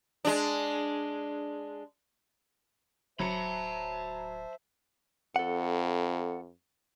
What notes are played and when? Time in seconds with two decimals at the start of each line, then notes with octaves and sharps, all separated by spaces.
0.25 G#3 D4
3.19 D1 F#3 C5 E5 A5 B5 C#7
5.36 F2 A4 F#5